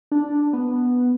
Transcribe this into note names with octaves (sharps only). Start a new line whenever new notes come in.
D4
B3